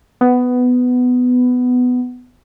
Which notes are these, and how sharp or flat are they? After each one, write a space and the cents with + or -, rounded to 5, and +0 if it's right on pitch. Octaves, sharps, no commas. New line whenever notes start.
B3 +10